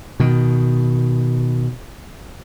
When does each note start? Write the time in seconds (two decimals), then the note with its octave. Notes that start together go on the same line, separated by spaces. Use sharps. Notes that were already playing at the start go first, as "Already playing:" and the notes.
0.20 B2 D#3